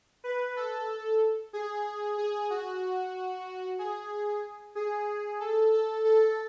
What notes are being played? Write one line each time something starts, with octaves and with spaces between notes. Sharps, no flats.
B4
A4
G#4
G#4
F#4
G#4
G#4
A4
A4
A4